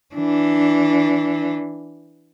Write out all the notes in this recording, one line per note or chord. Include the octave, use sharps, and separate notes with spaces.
E3 D4